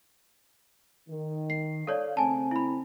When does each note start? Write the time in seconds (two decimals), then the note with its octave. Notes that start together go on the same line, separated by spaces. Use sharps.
1.09 D#3
1.50 C7
1.87 A4 C#5 D5 F5
2.17 C#3 A3 C4 G#5 A5
2.51 E4 B5